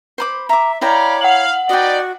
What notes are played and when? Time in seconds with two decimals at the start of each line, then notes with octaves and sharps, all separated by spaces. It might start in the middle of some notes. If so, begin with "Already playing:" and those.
0.18 C5 B5 D6
0.49 E5 A#5 D6
0.81 E4 C#5 D5 F5 G5 A#5 B5
1.21 F5 F#5 F#7
1.69 D#4 F#4 B4 D5 D#5 G5